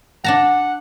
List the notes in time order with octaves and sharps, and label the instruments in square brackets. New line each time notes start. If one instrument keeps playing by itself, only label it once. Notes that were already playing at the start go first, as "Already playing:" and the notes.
[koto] D4 A5 A#5 [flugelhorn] F#5